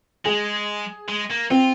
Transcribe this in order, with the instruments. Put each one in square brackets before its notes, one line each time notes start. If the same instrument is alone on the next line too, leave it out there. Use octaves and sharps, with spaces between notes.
[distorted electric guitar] G#3 [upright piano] G#4
[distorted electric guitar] G#3
A#3
[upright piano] C4 [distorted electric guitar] F4